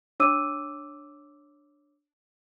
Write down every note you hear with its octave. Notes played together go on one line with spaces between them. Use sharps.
D4 C#5 D6 E6 D#7